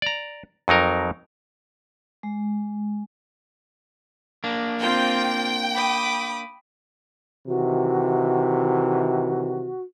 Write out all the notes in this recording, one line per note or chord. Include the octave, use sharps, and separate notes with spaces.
D5 A#5
F2 F#3 D#4 A#4
G#3
A#3 D4
C4 F4 G5 G6
B5 D6 D#6
C3 D#3 E3 F#4